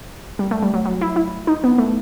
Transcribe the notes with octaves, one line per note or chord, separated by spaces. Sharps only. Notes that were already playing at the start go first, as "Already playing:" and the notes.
G3
A3
G3
F#3
F#3
E4
E4
D#4
B3
A3